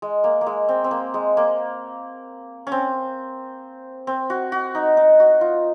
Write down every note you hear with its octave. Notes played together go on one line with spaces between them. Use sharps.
G#3
A#3
A#3
G#3
C4
C4
A#3
G#3
A#3
C#4
C4
C4
F#4
F#4
D#4
D#4
F#4
F4